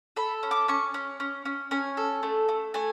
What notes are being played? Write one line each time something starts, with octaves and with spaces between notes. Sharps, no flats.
A4 B5
C#4
D6
C#4 C#6
C#4
C#4
C#4
C#4 G#5
A4
A3
A3
A3 G#5